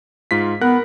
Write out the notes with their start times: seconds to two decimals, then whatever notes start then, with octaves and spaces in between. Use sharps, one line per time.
0.31 G#2 F4 B6
0.61 B3 A#4 F#5 F#6